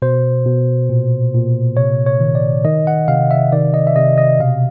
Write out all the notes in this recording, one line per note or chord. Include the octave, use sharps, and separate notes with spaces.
B2 C5
B2
A#2
A#2
C3 C#5
C#5
D#3
D5
D#3 D#5
F#5
C3 F5
E5
D#3 D5
D#5
E5
C3 D#5
D#5
B2 F5